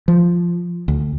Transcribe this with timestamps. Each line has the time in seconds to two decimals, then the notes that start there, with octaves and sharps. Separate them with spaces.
0.08 F3
0.88 D2